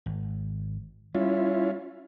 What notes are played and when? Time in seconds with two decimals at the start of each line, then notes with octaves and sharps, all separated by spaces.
0.06 G#1
1.15 G3 C#4 E4 F4